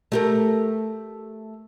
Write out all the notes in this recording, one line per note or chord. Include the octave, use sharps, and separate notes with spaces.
A3 G4 A#4